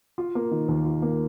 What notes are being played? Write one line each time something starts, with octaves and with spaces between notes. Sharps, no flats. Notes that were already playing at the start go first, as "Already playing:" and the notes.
F4
A#3
D#3
D#2
F4
A#3